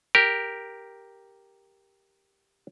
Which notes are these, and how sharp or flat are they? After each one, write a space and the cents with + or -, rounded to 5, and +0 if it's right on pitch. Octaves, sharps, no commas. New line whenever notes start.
G4 +0 A#4 +0